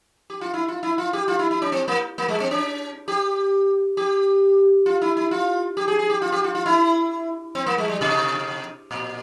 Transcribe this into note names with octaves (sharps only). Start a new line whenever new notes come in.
G4
F4
E4
F4
E4
F4
G4
F4
E4
E4
C#4
C4
A#3
A#3
G#3
C4
C#4
G4
G4
F4
E4
E4
F4
G4
G#4
G#4
G4
F4
G4
F4
F4
E4
C4
A#3
G#3
G3
C3
A#2